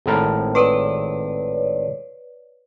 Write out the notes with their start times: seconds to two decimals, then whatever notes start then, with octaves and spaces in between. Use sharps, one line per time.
0.06 G#1 A2 A#4
0.55 B4 C#5 D5